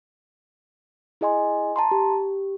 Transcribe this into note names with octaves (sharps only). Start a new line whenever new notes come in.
E4 G#4 D#5 G#5 C6
A5 A#5 C6
G4